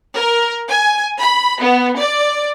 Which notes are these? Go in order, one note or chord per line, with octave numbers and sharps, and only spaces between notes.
A#4
G#5
B5
B3
D5